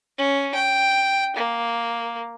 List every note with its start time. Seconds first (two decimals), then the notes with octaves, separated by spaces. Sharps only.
0.18 C#4
0.55 G5
1.36 A#3